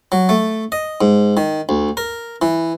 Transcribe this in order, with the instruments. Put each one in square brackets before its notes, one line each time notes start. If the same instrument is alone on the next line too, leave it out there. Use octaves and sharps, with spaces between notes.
[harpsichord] F#3
A3
D#5
G#2
D#3
D2
A#4
E3